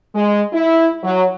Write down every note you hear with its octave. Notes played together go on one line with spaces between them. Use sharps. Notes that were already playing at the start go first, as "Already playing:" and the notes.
G#3
E4
F#3